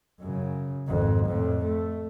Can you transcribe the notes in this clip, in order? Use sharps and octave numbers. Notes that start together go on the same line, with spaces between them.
F#2 C#3
G#1 F2
F2 A2
A3